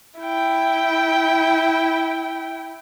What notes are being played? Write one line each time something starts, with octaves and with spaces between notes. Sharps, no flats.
E4 G5